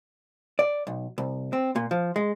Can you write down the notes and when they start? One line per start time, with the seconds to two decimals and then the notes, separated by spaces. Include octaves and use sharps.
0.59 D5
0.87 B1
1.18 C2
1.53 C4
1.76 A#2
1.91 F3
2.16 G#3